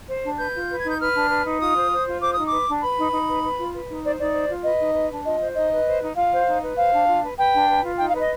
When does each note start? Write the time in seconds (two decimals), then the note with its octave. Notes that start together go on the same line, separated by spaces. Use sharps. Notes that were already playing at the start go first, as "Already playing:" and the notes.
0.08 C5
0.24 D4
0.38 B4 G6
0.54 F4
0.70 B4
0.79 G#6
0.85 D#4
0.90 G6
1.00 B4 F6
1.14 D4
1.29 B4
1.46 D#4
1.60 F4 D#6
1.76 C5
1.90 C5
2.07 F4
2.21 C5 D6
2.33 D#4 D#6
2.46 B4 D6
2.67 D4
2.83 B4 B5
2.97 D#4
3.12 D#4
3.28 B4
3.43 B4
3.58 F4
3.73 B4
3.89 D#4
4.04 C5 D5
4.20 D#4 D5
4.34 C5
4.49 F4
4.64 B4 D#5
4.79 D#4
4.95 B4
5.10 D4
5.26 F4 D#5
5.40 C5
5.56 D#4 D#5
5.71 B4
5.86 C5
6.01 D#4
6.16 F4 F5
6.32 C5
6.47 D#4
6.62 B4
6.77 C5 F5
6.93 D4
7.07 F4
7.23 B4
7.38 B4 G5
7.53 D4
7.69 B4
7.84 F4
7.99 D#4 G5
8.09 F5
8.15 B4 D#5